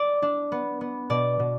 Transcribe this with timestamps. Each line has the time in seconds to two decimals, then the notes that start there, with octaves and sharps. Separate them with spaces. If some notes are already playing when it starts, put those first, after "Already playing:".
Already playing: D5
0.22 D4
0.52 B3
0.81 B3
1.10 B2 D5
1.39 B2